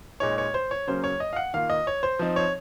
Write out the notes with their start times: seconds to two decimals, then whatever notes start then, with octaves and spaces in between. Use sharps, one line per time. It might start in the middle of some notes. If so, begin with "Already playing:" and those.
0.20 A#2 G#3 D#4 C#5
0.38 C#5
0.54 C5
0.71 C#5
0.87 C#3 F#3 A#3 C#4 C5
1.04 C#5
1.20 D#5
1.33 F5
1.36 F#5
1.54 D#3 A#3 F4 F5
1.70 D#5
1.87 C#5
2.03 C5
2.19 F3 C4 D#4
2.36 C#5